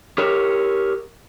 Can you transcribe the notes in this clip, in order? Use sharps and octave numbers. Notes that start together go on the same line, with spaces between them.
G4 A#4 C#5